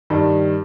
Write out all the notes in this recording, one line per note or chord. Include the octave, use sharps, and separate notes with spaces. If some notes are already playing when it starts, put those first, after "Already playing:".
G2 D#3 G3